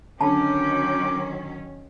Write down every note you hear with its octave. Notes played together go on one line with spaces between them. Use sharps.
D3 D#3 F#3 C#4 A#4 G5 A5 D6